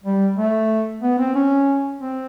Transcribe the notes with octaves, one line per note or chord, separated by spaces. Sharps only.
G3
A3
B3
C4
C#4
C4